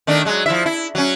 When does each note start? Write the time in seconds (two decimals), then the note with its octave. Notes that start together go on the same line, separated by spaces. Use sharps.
0.07 D#3 A3 D4
0.25 F#3 G#3
0.46 F3 E4 E5
0.66 E4
0.95 F#3 C#4